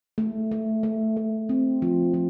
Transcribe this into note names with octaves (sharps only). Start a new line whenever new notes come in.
A3
A3
A3
A3
C4
F3
F3